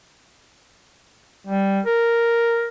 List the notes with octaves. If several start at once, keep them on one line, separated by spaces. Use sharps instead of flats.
G3
A#4